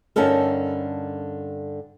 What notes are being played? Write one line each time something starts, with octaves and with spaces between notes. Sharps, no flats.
G2 D3 C#4 D#4 A4 A#4